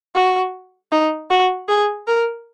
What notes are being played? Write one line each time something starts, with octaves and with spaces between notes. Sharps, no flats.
F#4
D#4
F#4
G#4
A#4